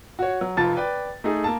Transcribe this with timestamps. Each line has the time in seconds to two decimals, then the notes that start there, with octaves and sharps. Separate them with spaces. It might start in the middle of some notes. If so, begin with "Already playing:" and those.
0.19 F#4 C#5
0.41 F#3
0.57 F1 F2 F4 A5 A6
0.77 B4 D5 G5
1.24 A3 D#4 G#4
1.44 A#3 A5